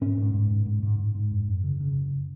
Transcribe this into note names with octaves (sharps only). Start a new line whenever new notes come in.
G#2 C#4
G#2
G#2
G#2
G#2
G#2
G#2
G#2
F#2
F#2
C#3
C#3
F#2